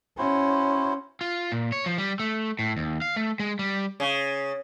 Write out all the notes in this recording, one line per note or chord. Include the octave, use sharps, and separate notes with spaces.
C#4 E4 F#4 C5
F4
A#2
C#5
F3
G3
A3
A2
D#2
F5
A3
G#3
G3
C#3